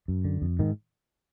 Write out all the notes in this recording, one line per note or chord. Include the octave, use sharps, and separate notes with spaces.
F#2
D3
F2
G#2 D#3